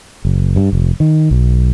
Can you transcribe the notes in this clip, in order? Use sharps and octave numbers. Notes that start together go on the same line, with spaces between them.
F#1
G2
F1
D#3
B1